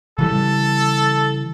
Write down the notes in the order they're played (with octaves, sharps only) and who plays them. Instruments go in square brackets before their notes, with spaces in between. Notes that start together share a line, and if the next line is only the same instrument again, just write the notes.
[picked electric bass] C#3 E3 G3 [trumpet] A4